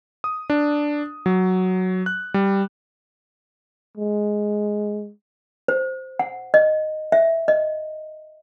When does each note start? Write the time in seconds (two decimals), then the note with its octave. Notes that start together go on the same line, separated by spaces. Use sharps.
0.24 D#6
0.50 D4
1.26 F#3
2.06 F#6
2.34 G3
3.97 G#3
5.68 C5
6.19 F#5
6.54 D#5
7.12 E5
7.48 D#5